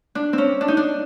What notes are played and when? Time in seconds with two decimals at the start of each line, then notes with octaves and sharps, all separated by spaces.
0.15 D4
0.33 C4
0.38 C#4
0.61 D4
0.68 D#4
0.77 D4